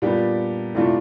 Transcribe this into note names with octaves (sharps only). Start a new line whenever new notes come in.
A#2 G3 B3 D4 G4
C3 E3 A3 D4 F4